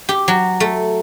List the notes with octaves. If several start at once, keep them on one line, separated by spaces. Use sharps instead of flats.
G4
F#3
A3